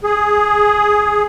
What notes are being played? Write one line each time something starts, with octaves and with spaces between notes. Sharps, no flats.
G#4